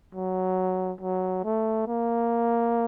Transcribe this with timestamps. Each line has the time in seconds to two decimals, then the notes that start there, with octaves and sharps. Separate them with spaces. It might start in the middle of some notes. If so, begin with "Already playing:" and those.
0.15 F#3
1.01 F#3
1.44 A3
1.87 A#3